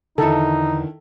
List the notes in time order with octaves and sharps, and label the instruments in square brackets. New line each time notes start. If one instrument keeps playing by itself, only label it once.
[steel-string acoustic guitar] E2 D3 [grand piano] D#3 E4 [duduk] D#4 [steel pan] A4